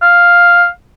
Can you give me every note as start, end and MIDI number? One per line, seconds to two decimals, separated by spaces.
0.02 0.68 77